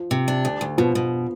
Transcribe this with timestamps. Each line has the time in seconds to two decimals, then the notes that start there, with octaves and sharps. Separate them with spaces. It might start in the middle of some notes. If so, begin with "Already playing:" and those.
Already playing: F3
0.11 C3
0.28 D4
0.45 D2
0.61 D2
0.78 B2 F3
0.95 B2